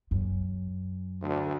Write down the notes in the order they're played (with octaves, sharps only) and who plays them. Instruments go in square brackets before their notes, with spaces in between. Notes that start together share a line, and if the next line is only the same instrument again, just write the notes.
[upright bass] F#2
[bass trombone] D2